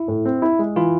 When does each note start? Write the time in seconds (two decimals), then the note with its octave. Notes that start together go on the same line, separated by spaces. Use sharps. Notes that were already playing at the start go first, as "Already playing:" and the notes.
Already playing: E4
0.08 A2
0.25 C4
0.42 E4
0.59 G#3
0.76 E3 F4